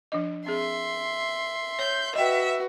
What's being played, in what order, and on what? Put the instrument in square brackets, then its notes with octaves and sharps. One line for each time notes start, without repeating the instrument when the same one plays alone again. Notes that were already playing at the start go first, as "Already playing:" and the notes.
[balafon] F3 D4 D#5
[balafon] C4 G#4 [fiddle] E5 C6
[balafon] C#5 [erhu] G6
[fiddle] F#4 B4 [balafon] D#5 G5 [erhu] E5